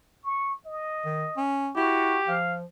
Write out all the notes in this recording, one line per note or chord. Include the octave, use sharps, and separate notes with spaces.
C#6
D#5
D#3
C#4
E4 F#4 G4
F3 F5